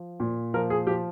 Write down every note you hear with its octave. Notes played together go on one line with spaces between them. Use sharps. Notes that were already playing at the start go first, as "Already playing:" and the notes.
Already playing: F3
A#2
F3 A#4
G#4
F3 G4